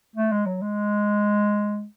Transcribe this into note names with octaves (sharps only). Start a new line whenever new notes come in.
A3
G#3
F#3
G#3